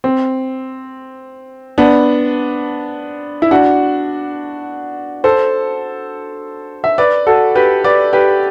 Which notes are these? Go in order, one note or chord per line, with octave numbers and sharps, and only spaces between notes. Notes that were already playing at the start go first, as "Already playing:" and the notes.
C4
B3 D4
E4
D4 F#4
A4 C5
E5
B4 D5
F#4 A4
G4 B4
B4 D5
G4 B4